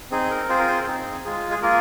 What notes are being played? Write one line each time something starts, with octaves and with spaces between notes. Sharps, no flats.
C4 D#4 G#4
A#4
C4 F4 G#4 C5
A#4
C5
C4 D#4 G#4
G#3 F4 G#4
G#4
A#3 F4 G#4 A#4